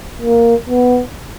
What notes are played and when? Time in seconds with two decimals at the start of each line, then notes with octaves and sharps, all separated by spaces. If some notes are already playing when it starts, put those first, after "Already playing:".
0.22 A#3
0.69 B3